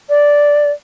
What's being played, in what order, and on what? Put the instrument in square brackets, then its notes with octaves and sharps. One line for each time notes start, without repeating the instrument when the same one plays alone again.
[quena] D5